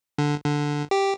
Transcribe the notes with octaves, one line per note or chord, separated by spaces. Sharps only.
D3
D3
G4